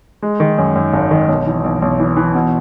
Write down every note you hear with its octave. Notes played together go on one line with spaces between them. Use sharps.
G#3
D#3
F#2
F#2
G#1
D#3
B1
E3
B1
B1
E3
E3
B2